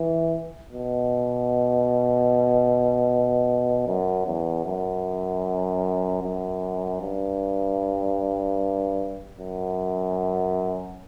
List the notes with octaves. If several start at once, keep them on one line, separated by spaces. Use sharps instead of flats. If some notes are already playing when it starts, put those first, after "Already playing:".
Already playing: E3
B2
F#2
E2
F#2
F#2
G2
F#2